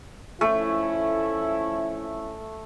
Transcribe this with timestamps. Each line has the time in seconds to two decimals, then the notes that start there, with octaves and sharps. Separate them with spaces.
0.41 F3 A3 C#4 E4